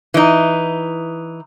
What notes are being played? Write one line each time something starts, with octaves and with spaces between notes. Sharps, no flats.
E3 D#4